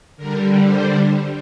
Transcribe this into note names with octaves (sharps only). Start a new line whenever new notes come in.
D3 G3 A#4
C5